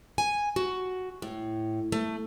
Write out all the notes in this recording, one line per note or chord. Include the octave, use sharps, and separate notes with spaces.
G#5
F#4
A2
A3